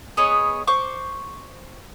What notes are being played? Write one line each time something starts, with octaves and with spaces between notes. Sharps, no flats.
B3 G#4 C#5 D#5
C5 C#6 D6